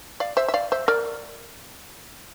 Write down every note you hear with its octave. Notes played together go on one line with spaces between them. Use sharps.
D5 F5
C5 E5
E5
D5 F5
C5 E5
A#4 D5